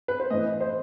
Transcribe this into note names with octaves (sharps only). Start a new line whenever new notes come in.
B4
C5
A2 E3 D#5
C5